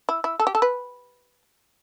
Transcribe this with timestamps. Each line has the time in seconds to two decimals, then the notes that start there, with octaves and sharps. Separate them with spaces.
0.09 E4
0.24 E4
0.40 A4
0.47 G4
0.55 A4
0.62 B4